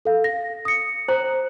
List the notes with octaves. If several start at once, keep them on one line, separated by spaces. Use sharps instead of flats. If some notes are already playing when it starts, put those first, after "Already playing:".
A4 F5
A#6
D#6 C#7
C5 A#5